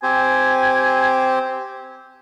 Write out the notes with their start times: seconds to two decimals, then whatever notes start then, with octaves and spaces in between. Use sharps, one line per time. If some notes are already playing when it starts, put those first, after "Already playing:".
0.03 C4 G4 C5 G#5